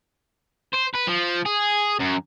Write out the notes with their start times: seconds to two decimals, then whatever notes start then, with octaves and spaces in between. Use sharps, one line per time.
0.74 C5
0.95 B4
1.08 F3
1.45 G#4
2.00 F#2